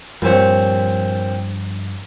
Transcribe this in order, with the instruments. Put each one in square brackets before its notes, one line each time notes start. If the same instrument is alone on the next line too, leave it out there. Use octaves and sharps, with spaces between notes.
[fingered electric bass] G2 [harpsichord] A#2 C4 [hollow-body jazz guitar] F3 G4 C#5